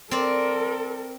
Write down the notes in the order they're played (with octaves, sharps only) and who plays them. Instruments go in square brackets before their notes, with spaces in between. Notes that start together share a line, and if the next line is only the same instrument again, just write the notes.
[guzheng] C4 D5 [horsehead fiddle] A4 A#4